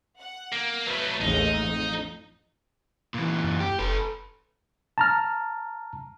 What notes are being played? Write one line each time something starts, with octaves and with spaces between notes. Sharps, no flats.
F#5
A#3
F#3 A3 B4
A1 D#2 G#3 D#4
F2
A#2 E3
F#2
G4
F1 A4 B4
A5 A#5 F6